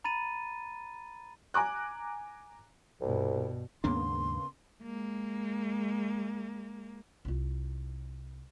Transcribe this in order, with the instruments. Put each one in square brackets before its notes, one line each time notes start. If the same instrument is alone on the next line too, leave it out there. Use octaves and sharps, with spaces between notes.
[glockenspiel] A#5 B5 A6 D#7
[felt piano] G#5 A#5 D6 F#6
[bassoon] C2 [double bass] G2 B2
[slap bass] D#2 G#2 D4 [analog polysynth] C#3 A#3 B3 [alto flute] C6
[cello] G#3 A#3
[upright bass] C2 F4